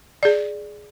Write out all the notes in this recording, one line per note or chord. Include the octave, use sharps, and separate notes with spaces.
G#4 D5